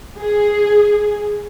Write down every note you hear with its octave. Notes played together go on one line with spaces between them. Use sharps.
G#4